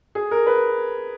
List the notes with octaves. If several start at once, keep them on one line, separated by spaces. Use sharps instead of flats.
G#4
A#4
B4